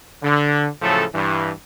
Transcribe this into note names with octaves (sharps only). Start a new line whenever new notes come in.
D3
A2 C#3 F3 F#3 A3 A4
G2 E3